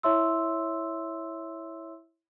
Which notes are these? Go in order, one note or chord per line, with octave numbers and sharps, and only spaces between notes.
E4 C#5 E5 C6 E6